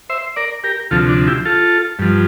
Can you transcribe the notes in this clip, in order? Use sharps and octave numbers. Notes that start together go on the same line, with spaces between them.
C5 E5
A#4 D5
G4 A#4
D2 C3 F3 F4 A4
D4
E4 G4
F4 A4
G2 F3